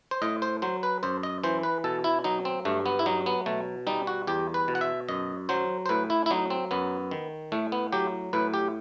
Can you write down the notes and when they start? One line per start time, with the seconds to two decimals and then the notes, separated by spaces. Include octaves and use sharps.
0.11 C5
0.22 A2 D#5
0.42 C5
0.62 F#3 C5
0.83 B4
1.03 F#2 C5
1.23 D#5
1.44 E3 C5
1.63 B4
1.84 B2 A4
2.04 E4
2.24 F#3 D#4
2.45 C4
2.65 G2 A3
2.86 B3
2.99 E4
3.06 F#3 D#4
3.26 B3
3.46 B2 A3
3.87 G3 D#4
4.07 F#4
4.27 E2 G4
4.54 B4
4.68 B2
4.75 F#5
4.81 E5
5.09 F#2 D#5
5.49 F#3 C5
5.86 C5
5.89 A2 B4
6.10 E4
6.26 E4
6.31 F#3 D#4
6.50 C4
6.71 F#2 B3
7.11 D#3
7.52 A2 A3
7.72 B3
7.92 F#3 G4
8.33 A2 B4
8.54 G4